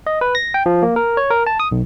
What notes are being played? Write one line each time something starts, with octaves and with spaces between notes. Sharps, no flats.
D#5
B4
A#6
G5
F3
A#3
A#4
C#5
A#4
A5
D#6
B1